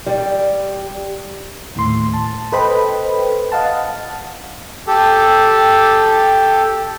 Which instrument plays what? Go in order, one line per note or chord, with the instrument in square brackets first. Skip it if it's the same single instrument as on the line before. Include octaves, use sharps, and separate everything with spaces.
[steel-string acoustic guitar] G3
[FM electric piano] D#2 A2 C6
A5
A4 B4 C5 D#5 G5 B5
D#5 F5 F#5 A5
[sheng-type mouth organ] G4 A4